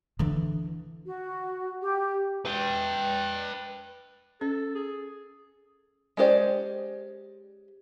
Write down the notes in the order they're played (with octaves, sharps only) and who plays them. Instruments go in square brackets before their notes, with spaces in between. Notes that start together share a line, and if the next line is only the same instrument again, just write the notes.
[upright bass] D3 E3
[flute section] F#4
G4
[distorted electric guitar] B4 G5
[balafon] C#4 [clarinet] A4
[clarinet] G#4
[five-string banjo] G#3 C#4 G4 C5 D5